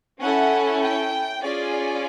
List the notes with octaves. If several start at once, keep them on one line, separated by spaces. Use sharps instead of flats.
C#4 E4 A4 F#5
G5
C#4 F4 G#4 D5